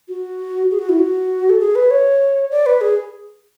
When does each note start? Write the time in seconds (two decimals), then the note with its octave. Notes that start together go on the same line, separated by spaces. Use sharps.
0.08 F#4
0.71 G#4
0.79 F#4
0.89 E4
0.99 F#4
1.50 A4
1.60 G#4
1.75 B4
1.91 C#5
2.51 D5
2.66 B4
2.81 G#4